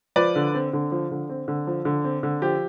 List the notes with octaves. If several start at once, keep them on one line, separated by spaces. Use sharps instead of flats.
F3 B4 D5
D3
C4
D3
F3
D3
C4
D3
F3
D3
C4
D3
F3 G4